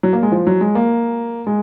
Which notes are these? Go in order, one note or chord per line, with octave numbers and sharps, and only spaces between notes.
F#3
A#3
G#3
F3
F#3
G#3
A#3
G#3